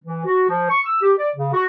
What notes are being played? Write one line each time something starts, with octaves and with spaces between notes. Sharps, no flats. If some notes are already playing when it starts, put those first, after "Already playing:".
E3
F#4
F3
C#6
E6
G4
D5
C#3
F#4